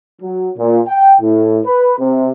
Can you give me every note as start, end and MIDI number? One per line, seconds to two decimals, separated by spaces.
0.21 0.50 54
0.57 0.80 46
0.88 1.14 79
1.20 1.59 45
1.65 1.93 71
1.99 2.30 48